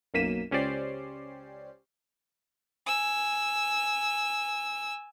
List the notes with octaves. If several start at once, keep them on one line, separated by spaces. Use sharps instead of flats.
B1 F#2 A#3 B6 D#7 E7
C#2 C#4 G4 C5 D5 C7
G#5 E6